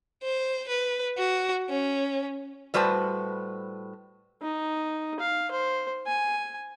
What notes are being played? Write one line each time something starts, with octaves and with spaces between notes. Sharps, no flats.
C5
B4
F#4
C#4
A2 G3 F#4 B4 C5 A5
D#4
F5
C5
G#5